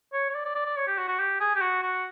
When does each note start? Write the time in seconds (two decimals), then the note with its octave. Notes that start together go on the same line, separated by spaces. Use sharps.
0.13 C#5
0.29 C#5
0.35 D5
0.45 D5
0.55 D5
0.66 D5
0.77 C#5
0.87 G4
0.98 F#4
1.08 F#4
1.19 G4
1.40 G#4
1.56 G4
1.61 F#4
1.82 F#4